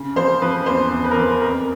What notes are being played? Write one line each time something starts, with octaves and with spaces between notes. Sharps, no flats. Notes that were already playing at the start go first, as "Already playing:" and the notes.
Already playing: C#3
F3 C5
F3 B4
E2 C5
E2
B4
A#4
F3 B4
F2 A#4